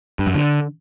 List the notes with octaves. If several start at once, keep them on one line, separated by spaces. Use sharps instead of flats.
G2
F#2
D3